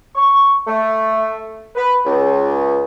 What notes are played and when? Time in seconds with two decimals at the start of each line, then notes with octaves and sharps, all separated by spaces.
0.15 C#6
0.66 A3
1.75 B4
2.05 C#2